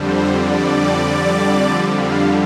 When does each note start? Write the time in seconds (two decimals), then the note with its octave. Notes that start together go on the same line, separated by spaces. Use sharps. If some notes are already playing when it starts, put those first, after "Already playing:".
Already playing: F2 D3 G3 C5
0.31 D5
1.87 F5